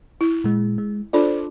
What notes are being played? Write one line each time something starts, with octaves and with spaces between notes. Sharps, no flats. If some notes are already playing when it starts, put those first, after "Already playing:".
E4
A#2 G#3
G#3
D4 F4 A4 C5 D5